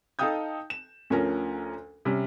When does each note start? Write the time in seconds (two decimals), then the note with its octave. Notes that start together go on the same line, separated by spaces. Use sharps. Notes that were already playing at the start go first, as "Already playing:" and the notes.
0.19 D#4 A4 F5 G5 D#6 G6
0.70 E7
1.10 D2 F3 C#4 A#4
2.05 C3 G3 C#4